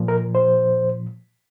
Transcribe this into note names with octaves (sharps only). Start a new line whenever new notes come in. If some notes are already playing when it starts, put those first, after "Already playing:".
Already playing: A#2 F3
A#4
C5